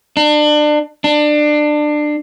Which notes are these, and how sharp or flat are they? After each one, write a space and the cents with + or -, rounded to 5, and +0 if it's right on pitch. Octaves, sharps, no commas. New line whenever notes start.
D4 +30
D4 +25